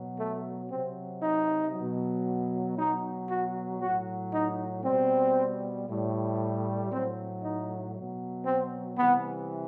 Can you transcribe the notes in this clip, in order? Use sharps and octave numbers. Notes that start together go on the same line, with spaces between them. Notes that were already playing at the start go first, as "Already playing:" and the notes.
Already playing: B2 F#3
A3
C3 F#3 C4
D#4
B2 F#3
B2 F#3 D#4
F#4
A2 F#3 F#4
D#4
B2 G3 C4
A2 G3
A2 F#3 C4
D#4
B2 F#3
C4
C3 E3 G3 B3